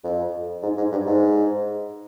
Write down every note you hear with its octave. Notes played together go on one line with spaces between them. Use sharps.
F2
G#2
G#2
G2
G#2